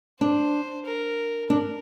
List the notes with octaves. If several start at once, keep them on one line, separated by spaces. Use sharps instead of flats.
D4 C5
A#4
D4 A#4